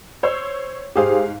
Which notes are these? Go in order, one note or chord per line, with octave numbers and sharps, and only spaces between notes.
C5 C#5 E6
G#2 G4 G#4 C5 F5